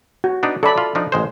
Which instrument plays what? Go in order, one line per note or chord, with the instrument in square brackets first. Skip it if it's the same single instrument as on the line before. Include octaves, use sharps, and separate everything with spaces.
[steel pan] F#4
[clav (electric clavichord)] B3 D4 D#4
[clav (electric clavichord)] F#3 [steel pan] A4 D5 B5
[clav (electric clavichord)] F4
F3 D4 D#4
A1 G#3 C5